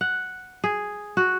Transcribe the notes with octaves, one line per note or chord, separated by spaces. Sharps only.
F#5
G#4
F#4